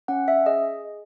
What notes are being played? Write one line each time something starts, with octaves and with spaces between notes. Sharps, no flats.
C#4 F#5
E5
G#4 D#5